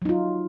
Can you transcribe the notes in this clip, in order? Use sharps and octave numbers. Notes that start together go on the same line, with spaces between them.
F#3 D#4 F4